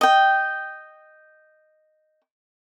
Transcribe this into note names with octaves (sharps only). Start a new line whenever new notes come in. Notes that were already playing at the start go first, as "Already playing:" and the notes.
D#5 G5